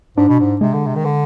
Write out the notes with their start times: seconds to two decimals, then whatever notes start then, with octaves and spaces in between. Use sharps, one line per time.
0.17 G#2 D4
0.28 B2
0.40 G#2
0.61 C3 G#3
0.73 D3
0.86 C3
0.95 D#3
1.05 D3